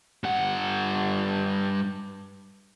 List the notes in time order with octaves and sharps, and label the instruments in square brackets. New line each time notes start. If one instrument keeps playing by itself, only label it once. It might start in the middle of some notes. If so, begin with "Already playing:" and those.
[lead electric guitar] G2 F#5